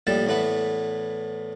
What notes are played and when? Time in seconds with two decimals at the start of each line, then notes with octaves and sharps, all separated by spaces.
0.07 A#1 A2 G3 A4 G5 A5
0.27 E2 A2 A3 B4 F#5